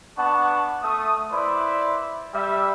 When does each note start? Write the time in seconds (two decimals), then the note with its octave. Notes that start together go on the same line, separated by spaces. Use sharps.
0.16 B3 D4 F#5 A5 C#6
0.81 A3 D#6
1.31 E4 B4 C5 D5 E5 B5
2.33 G3 E5